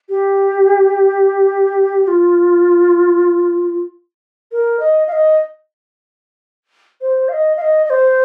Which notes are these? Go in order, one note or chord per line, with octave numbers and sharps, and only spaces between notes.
G4
G4
F4
A#4
D#5
F5
D#5
C5
F5
D#5
F5
D#5
D#5
C5